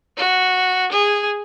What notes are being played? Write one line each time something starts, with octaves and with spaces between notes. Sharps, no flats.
F#4
G#4